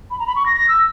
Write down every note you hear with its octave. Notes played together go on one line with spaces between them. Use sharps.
B5
A#5
B5
C#6
A#6
A#6
E6